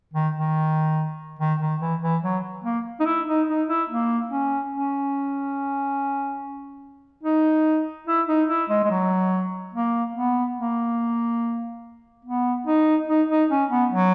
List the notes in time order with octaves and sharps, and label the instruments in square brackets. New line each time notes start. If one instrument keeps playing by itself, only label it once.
[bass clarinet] D#3
D#3
D#3
D#3
E3
E3
F#3
A#3
D#4
E4
D#4
D#4
E4
A#3
C#4
C#4
D#4
E4
D#4
E4
G#3
G#3
F#3
A#3
B3
A#3
B3
D#4
D#4
D#4
C#4
B3
F#3